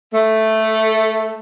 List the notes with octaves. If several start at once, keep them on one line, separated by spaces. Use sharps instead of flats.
A3